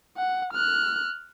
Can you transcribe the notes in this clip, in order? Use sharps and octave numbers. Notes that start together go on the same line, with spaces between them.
F#5
F6 F#6